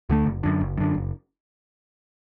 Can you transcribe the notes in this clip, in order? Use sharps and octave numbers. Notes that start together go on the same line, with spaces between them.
D2 D3 A3
F#1
F#2 D3
F#1
F#2 D3
F#1